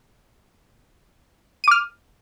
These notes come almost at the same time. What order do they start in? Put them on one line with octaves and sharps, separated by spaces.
D#7 D6 F6